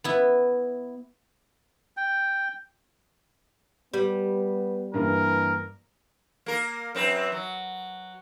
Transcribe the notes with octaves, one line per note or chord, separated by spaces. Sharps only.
B3 E4
G5
G3 B3
G2 E3 A#3 A#4
A#3 A#4
F#2 C4 B4
F#3